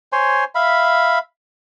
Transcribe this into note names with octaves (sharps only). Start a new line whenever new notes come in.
C5 C#5 G#5 C6
E5 F5 B5